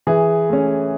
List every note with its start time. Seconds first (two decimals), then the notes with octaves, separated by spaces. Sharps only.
0.07 E3 G#4
0.49 A3 C#4